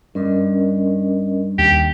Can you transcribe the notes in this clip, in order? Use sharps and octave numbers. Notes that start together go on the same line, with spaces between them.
G2 C#4 A#4 D#5
D#2 G4